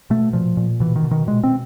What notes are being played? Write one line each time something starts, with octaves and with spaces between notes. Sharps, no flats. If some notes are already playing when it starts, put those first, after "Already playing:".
B2 A3
A#2 F3
A#2
B2 E3
D#3
B2
D#3
A#2 G#3
C4